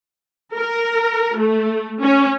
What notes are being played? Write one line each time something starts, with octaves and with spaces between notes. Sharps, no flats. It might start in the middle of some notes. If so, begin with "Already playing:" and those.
A#4
A3
C#4